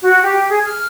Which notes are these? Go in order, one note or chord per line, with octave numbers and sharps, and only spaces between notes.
F#4
G4
G#4
F6